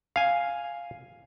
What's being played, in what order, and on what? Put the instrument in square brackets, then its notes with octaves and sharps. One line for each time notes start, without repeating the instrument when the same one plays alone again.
[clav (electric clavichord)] F5 G#5